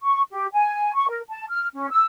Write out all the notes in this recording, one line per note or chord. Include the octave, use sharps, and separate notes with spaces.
C#6
G4
G#5
C#6
A#4
A5
F6
C#4
E6